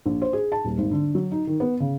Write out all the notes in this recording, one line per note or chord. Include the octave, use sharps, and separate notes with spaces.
A#1
C5
G#4
A5
D#1
G#1
D3
F#3
D#4
D#3
B3
C#3